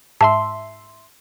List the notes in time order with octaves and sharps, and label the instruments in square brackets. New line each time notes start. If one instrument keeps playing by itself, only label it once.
[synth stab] G#2 E5 C6 [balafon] A5